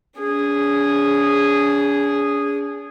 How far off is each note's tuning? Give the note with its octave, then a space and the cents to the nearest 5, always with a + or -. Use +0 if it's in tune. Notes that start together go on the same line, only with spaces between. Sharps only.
D4 -45 G#4 -10